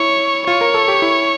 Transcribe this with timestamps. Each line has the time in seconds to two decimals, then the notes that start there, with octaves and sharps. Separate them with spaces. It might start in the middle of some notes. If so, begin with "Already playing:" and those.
Already playing: E4 C#5
0.47 F4 C#5
0.61 A#4
0.74 A4
0.88 G4
1.02 E4